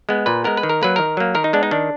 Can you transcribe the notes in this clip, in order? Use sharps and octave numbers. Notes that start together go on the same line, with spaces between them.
G#3 B3
A#2 B4
G#3 B3 A#4
B4
D#3
A#4
F#3 A#3 B4
D#3 A#4
F#3 A#3
D#3 A#4
D#4
G#3 B3 D4
D#4
D#3 D4